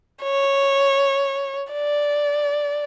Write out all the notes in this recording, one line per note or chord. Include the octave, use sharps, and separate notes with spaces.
C#5
D5